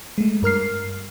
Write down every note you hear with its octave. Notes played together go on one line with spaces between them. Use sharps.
G#3 A3
G2 A#4 F6 C7